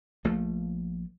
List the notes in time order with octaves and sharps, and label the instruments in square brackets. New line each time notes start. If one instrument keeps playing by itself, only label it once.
[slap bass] A#1 F3 A3